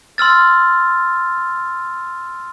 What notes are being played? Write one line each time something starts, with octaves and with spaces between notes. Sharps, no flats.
C6 E6 F6 A6